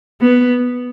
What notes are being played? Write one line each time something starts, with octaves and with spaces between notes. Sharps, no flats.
B3